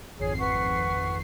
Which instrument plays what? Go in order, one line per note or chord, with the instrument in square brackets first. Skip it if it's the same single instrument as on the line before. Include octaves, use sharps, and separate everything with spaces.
[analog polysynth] G#1 F2 C7 [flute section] G#4 C#5
[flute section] B4 F#5 C#6